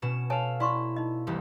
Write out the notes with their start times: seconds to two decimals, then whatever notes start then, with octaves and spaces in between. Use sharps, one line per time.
0.02 B2 C#4 E7
0.30 A4 C#5 F5 G#5 A5
0.60 E4 A4 D5 C6 C#6
0.96 D#4 D#5
1.27 E1 C2 G4